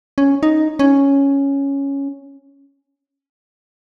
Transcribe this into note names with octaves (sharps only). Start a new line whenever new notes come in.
C#4
D#4
C#4